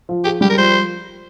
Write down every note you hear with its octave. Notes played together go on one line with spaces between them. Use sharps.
F3
G4 G#4
G3 G4
A#4
F3 C5